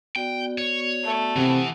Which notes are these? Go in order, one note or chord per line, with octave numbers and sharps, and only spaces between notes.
B3 F#4 D5 G5
C#5
A3
C3 E3 F#5 D#6